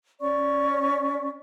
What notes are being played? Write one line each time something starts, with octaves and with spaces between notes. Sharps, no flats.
C#4 D5 C#6